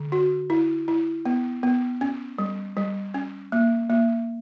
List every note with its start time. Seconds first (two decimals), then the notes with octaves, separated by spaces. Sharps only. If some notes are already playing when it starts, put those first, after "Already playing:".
Already playing: D3
0.12 F#4
0.50 E4
0.88 E4
1.26 B3
1.63 B3
2.01 C#4
2.38 G3
2.77 G3
3.14 C#4
3.52 A#3
3.90 A#3